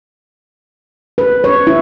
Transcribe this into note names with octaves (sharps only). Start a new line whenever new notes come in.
B4
C#5
E4